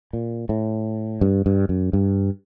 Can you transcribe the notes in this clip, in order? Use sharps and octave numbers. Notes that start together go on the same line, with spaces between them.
A#2
A2
G2
G2
F#2
G2